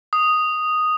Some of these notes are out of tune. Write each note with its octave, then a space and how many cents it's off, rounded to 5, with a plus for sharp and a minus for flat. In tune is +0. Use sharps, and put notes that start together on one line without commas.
D#6 -5